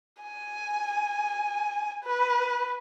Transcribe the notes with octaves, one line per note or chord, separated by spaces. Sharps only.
G#5
B4